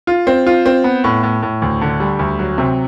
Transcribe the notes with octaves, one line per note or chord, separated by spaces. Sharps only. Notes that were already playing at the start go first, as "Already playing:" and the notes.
F4
C4
F4
C4
B3
A2
A2
A2
D2
D3
G3
D2
F#3
C3